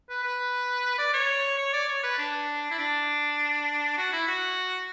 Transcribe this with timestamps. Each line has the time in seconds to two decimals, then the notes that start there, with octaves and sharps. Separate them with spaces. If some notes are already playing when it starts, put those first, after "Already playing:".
0.09 B4
0.24 B4
0.98 D5
1.13 C#5
1.58 C#5
1.73 D5
1.88 C#5
2.03 B4
2.19 D4
2.71 E4
2.78 D4
3.97 F#4
4.13 E4
4.28 F#4